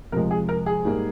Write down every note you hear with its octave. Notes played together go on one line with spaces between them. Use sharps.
F2 C3 F3 G#3 A#4
G#4
A#4
G#4
G#2 G3 A#3